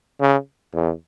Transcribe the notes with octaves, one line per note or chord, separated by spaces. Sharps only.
C#3
E2